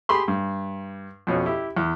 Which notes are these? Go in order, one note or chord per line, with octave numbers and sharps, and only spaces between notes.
G4 G#4 B5 C6
G2
F2 B2 C#4
E4 G4
E2